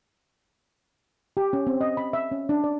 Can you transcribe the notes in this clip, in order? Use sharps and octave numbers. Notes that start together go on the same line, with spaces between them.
G4
C#4
C4
D#5
B5
E5
C#4
D4
D5